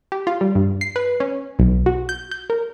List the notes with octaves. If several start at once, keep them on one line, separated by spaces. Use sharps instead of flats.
G4
F4
G3
G2
C7
B4
C#4
B1
F#4
G6
G6
A#4